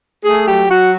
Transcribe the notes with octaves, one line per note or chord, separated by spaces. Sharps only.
A3 G#4
F#3 G4
F#3 F#4